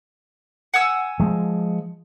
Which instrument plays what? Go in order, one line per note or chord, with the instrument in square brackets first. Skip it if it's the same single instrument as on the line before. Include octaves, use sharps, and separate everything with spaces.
[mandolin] F#5 G#5 E6
[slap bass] F3 G#3